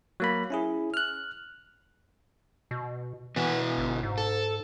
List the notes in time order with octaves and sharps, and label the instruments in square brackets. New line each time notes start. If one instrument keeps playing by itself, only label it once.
[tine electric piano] F#3 A#3 B5
C#4 E4 G#4
F6 F#6
[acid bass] B2
[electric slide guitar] B2 B3 E4 [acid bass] E3
[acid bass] G1
G#2
[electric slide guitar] A4